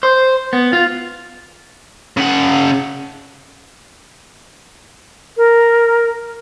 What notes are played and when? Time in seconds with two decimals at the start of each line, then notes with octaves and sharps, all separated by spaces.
0.03 C5
0.53 B3
0.73 F4
2.17 C#3 F#5
5.37 A#4